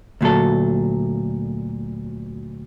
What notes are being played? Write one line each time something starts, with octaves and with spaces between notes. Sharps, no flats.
D2 A#2 F#3 A4